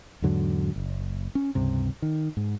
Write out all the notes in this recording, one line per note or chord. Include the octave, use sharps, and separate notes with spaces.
E2 G#2 D3 F#3
F#1
C#4
C#2 G2 C3
D#3
G#2